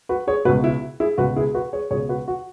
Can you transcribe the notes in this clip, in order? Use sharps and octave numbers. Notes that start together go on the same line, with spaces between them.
F#4 B4
G#4 C#5
C#2 B2 F#4 B4
E4
E4 G#4
C#2 B2 F#4 B4
E4 G#4
F#4 B4
G#4 C#5
C#2 B2 G#4 C#5
F#4 B4
F#4